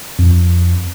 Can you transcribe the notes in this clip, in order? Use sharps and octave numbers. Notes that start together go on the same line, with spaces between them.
F2